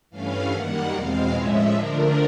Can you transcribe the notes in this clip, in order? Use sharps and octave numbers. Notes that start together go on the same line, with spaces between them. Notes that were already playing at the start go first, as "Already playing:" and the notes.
G2 E3 A3 C#4 F5
F#2 D#3 G3 A#3 F#5
E2 B2 G#3 C4 F5
A2 F3 G#3 C#4 E5
D3 F3 A3 D4 A#4